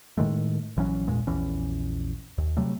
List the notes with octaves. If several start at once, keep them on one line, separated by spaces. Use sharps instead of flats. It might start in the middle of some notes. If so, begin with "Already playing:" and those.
A2 D#3 G#3 A3
A#1 E3 F#3 C#4
G#1 E2 A#2 G#3
A#1 E2 E3 C#4
D#2
C3 F#3 G3 A3